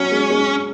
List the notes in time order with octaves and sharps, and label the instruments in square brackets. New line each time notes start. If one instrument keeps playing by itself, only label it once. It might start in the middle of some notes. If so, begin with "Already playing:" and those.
Already playing: [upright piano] F#3 [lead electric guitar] C#4
[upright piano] G#3
G#3